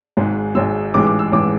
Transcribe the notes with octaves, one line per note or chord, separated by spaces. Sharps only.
G#1 G#2 G#3
G#1 G#2 G#3 E6
A1 G#2 E3 G#3 D6
D6
E6
A1 G#2 E3 G#3 D6